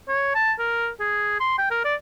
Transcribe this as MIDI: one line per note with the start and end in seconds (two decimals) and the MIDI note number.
0.08 0.31 73
0.35 0.52 81
0.59 0.89 70
1.00 1.39 68
1.40 1.56 84
1.58 1.71 79
1.71 1.83 70
1.85 1.94 74